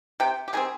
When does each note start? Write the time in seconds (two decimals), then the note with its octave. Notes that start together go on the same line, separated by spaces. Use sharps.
0.20 C3 G5
0.48 G4
0.53 D#3 G3 C4 G#4